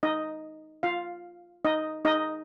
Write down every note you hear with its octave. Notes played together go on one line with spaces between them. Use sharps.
D#4 D#5
F4 F5
D#4 D#5
D#4 D#5